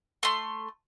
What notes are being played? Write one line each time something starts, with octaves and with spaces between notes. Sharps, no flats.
A3 C6